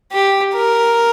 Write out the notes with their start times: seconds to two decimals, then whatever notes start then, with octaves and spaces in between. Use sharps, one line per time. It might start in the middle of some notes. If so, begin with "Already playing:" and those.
0.12 G4
0.54 A#4